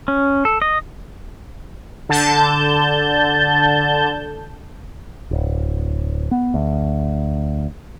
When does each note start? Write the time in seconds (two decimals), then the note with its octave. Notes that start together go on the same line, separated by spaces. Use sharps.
0.08 C#4
0.45 A4
0.62 D#5
2.09 D3 A5 G6
5.31 D1
6.31 B3
6.54 D2